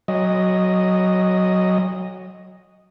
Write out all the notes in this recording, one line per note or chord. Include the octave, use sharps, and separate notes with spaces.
F#3 D#5